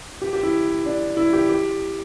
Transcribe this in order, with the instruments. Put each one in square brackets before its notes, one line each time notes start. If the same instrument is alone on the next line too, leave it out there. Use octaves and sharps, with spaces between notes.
[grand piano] G4
G4
E4
D4
E4
G4
G4